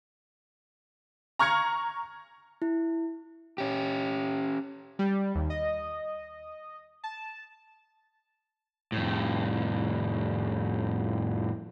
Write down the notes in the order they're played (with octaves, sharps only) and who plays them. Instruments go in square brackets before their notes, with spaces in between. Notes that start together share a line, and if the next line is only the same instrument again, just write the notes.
[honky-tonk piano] A#5 C#6 F6 G#6 C#7
[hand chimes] E4
[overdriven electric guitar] C#4 G4
[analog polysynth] G3
D#2
D#5
A5
[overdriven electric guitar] F2 A2